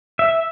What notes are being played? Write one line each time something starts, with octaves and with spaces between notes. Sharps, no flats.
E5